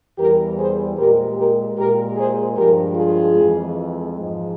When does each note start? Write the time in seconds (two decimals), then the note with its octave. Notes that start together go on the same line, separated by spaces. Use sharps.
0.17 E2 E3 G3 G4 A#4
0.57 G#4 C5
0.97 A#2 G#3 G4 A#4
1.36 G4 A#4
1.76 A#2 G#3 G4 A#4
2.16 G#4 C5
2.56 G2 F3 G#3 G4 A#4
2.95 F4 G#4
3.36 F2 E3 G#3
4.15 G#2 F3 G#3